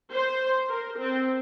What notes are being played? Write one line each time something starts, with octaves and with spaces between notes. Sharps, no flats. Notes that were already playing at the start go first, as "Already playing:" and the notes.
C5
A#4
C4